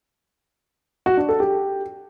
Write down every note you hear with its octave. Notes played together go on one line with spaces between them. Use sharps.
F#4
D4
A4
G4